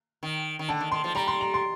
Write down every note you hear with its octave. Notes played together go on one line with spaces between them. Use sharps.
D#3
D#3
D3 A5
D#3
D#3 C6
F3
G3 A#5
C6
A#5
C6